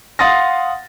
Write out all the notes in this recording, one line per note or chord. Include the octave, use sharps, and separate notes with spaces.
F5 F#5 C6 D#6 A6 A#6